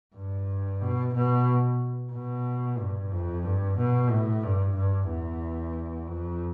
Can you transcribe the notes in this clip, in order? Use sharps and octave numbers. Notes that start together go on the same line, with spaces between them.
G2
B2
B2
B2
G2
F2
G2
B2
A2
G2
G2
E2
F2